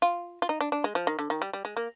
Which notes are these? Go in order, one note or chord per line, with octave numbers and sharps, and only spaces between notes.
F4
F4
D#4
D4
D4
G#3
F3
D#3
D3
D#3
G3
G3
G#3
A#3